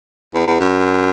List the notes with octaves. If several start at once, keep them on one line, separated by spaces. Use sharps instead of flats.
E2
E2
F#2